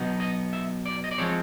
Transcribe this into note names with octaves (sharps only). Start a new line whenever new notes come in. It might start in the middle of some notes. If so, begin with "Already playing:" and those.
Already playing: B2 F#3 B3 D#4
D#5
E5
D5
D#5
D5
F3 G#3 C4 C#5